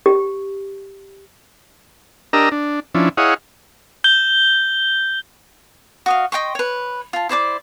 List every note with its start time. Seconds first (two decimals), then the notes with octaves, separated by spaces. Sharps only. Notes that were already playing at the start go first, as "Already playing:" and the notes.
0.06 G4
2.33 D4 G4 A#4 D#5 A#5 E6
2.52 D4
2.95 F3 C#4 D4 E4
3.17 E4 G#4 C#5 D#5 F5 F#5
4.04 G6 G7
6.06 F#4 D#5 F5
6.32 D#5 G5 C6 C#6
6.55 B4 C#5
7.13 F4 A5
7.29 E4 C5 D5 D6